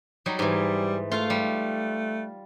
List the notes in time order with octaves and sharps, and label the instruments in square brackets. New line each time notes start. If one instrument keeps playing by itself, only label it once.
[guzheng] F#3 G3 D#4
[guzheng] G#2 E3 [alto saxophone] G3
[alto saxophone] A3 [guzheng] F4 F5
[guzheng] G3